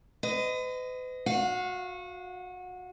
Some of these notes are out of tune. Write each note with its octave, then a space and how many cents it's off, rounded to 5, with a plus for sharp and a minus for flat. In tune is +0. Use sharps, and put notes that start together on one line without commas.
B4 +45 D#5 +0
F#4 -25 F5 +0